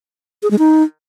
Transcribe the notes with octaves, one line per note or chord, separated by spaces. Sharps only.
G#4
G#3
D#4